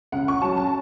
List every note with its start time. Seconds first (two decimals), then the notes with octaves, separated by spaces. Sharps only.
0.12 C#3 F#5
0.28 C#6
0.42 F#3 A5
0.57 A5